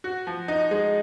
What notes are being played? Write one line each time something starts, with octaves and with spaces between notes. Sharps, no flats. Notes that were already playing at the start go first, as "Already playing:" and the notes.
F#4
F3
D#4
G#3